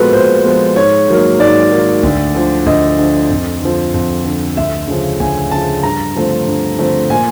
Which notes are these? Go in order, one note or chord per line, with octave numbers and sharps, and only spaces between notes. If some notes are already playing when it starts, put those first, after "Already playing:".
Already playing: A#2 F3 G#3 B3 F#4 A4 B4
A#2 C5
F3 G#3 B3
G#2 C#5
D#3 F#3 A#3
G#2 D5
D#3 F#3 A#3
D2
D3 F3
D2 D#5
D3 F3
F2
D3 F3
F2
D3 F3
D2 E5
C#3 F3
D2 G#5
C#3 F3 A5
G2 A#5
D3 F3 A3 C4
G2
D3 F3 A3 C4
A#2 G#5